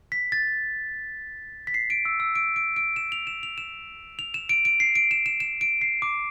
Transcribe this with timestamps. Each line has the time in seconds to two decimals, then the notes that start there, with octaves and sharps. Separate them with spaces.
0.12 B6
0.32 A6
1.67 B6
1.74 C7
1.90 D7
2.05 E6
2.20 E6
2.35 D7
2.56 D7
2.76 D7
2.96 E7
3.12 F7
3.27 E7
3.43 F7
3.58 E7
4.19 F7
4.34 E7
4.49 D7
4.65 D7
4.80 C7
4.95 D7
5.11 E7
5.26 E7
5.40 E7
5.61 D7
5.81 C7
6.02 D6